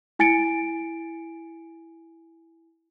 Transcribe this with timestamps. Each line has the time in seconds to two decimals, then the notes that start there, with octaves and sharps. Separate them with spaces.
0.19 E4 G#5 A6 C#7 D7